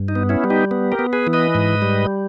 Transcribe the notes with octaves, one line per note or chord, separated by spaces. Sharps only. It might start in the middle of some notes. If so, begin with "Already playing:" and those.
Already playing: G2
D#4
B3
C#4 E4
G3
D#4 G4
B3
G4 A#4
B3
G#4 B4
E3
B4 D#5
G#2
G3